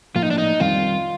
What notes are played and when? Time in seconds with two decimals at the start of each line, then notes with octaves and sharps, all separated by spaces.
0.15 A2 F3 A#3 F4
0.23 D#4
0.31 D4
0.38 D#4
0.60 F2 D#3 G3 C4 F4